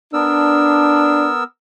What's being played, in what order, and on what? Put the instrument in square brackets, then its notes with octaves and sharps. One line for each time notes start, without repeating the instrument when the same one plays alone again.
[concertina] B3 A#4 E6 [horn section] D4